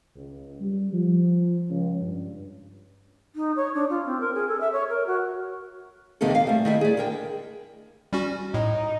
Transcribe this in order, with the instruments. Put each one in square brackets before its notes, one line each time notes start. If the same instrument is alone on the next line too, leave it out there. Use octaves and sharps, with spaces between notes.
[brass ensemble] C#2
G3
F3
C#2
G2
[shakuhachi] D#4
C#5
D4
F4
C4
A#4
G#4
A4
E5
C#5
A#4
F#4
[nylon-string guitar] E2 C3 D#3 G#3 A#3 A4
F5
G3 A3
D#3 A3 E4
G#4 D5
D3 A#4 G5
[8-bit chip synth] G3 C#4 F#4
[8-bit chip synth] A2 [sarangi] D#4 [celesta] D#5